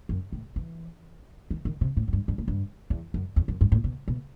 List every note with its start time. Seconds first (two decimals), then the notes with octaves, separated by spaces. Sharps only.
0.09 F#2
0.32 A2
0.56 E3
1.51 D#3
1.65 D#3
1.81 C3
1.97 A2
2.08 F#2
2.13 G2
2.28 G2
2.38 A2
2.48 G2
2.90 E2
3.14 F#2
3.36 E2
3.48 F#2
3.61 G2
3.72 A2
3.84 B2
4.08 B2